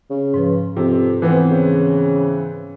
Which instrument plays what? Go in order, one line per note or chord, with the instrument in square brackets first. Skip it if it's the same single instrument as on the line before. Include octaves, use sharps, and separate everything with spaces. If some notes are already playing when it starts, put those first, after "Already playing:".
[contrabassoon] C#3
[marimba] G#2 F3 B4
[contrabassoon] F2 [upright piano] C3
[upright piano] E3 B3 C4
[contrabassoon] C#3